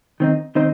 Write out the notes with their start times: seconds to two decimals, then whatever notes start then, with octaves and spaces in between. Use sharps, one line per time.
0.20 D#3 C4 D#4
0.55 D#3 C4 D#4 C5